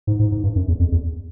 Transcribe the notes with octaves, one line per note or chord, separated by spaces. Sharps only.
G#2
G#2
G#2
G2
F#2
E2
F2
E2